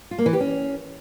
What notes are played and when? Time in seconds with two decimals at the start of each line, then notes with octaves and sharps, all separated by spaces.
0.11 F4
0.18 A#3
0.26 E3
0.33 G4
0.40 C#4